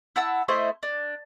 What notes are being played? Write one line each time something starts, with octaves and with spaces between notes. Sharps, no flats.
E4 F#5 A5 E6
A3 E4 C5 D#5
D4